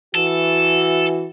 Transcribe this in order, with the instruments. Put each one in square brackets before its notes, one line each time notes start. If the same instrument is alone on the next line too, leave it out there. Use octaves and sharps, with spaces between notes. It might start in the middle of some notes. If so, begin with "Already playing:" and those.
[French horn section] E3 F#4 [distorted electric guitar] A4